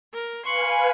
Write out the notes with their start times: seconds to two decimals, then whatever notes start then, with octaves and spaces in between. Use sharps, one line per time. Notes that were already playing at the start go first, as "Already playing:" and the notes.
0.11 A#4
0.44 B4 F5 G#5 C6 C#6 F#6